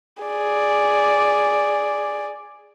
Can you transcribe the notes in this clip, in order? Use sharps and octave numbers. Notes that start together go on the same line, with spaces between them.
G#4 D5